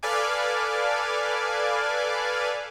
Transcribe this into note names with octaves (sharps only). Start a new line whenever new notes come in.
A4 B4 D5 F5 G#5 D6